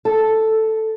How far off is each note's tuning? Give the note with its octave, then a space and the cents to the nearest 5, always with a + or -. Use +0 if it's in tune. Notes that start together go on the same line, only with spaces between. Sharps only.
A4 +0